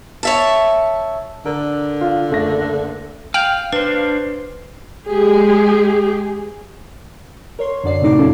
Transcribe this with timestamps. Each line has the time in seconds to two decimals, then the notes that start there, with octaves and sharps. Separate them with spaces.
0.23 C#5 E5 A5
1.46 D3 A#4
2.01 F4
2.30 F#1 A3 A#6
3.34 F5 G5 G6 F7 F#7
3.73 D4 B4 C5
5.08 G#3 G4 G#4
7.59 A#4 C#5 C6
7.84 F#2 D3 F#4 D5 C7
8.02 A2 C3 A3 D#4 D6
8.18 B1 F2 C3 C#4 F4 A4